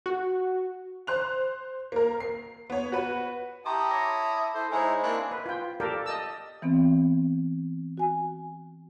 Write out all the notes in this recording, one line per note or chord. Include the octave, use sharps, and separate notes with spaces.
F#4
C5 F#6 F7
A#3 A#4
C7
B3 C#5
F#4 B4
E4 G4 A5 A#5 C6 C#6 D#6
C#5 D6 A#6
E4 A4 C5
G#3 D#4 E4 C5 C#5 G#5
A#3 C4 D4 E4 C#5 F#6
B4
F4 G5
G4 A4 A#4 D5 F5 G5
D#5 A5 E6
E3 B3 C4
F#4 G#5